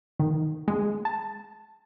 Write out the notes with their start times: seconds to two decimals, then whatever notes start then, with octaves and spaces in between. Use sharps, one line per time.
0.20 D#3
0.68 G#3
1.05 A5